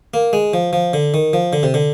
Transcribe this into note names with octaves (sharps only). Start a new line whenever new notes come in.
A#3
G#3
F3
F3
D3
D#3
F3
D3
C3
D3